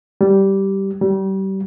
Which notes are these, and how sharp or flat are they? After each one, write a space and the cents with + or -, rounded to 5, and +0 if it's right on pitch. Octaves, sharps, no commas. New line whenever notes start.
G3 -10
G3 -30